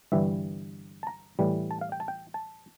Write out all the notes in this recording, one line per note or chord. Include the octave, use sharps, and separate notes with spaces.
G1 G2 E3 G3 E5
A5
A#5
A2 E3 G3
A5
F5
G5
A5
G5
A5